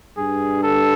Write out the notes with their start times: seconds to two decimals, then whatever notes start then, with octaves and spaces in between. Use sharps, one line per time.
0.16 G2 G#4
0.63 A4